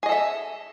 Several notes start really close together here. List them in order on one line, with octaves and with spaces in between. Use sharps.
G#4 D#5 A4 E5